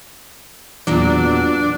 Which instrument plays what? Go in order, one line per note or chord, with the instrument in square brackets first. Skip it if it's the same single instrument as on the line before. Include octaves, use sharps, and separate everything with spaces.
[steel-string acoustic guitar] E2 A#2 F#3 [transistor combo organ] D4